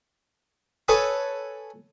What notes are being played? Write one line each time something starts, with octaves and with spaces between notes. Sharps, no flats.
A4 B4 C#5 G#5 D#6